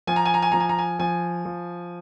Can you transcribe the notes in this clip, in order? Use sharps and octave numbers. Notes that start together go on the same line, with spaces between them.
F3 G#5
A#5
G#5
A#5
G#5
F3 A#5
G#5
A#5
G#5
F3 G#5
F3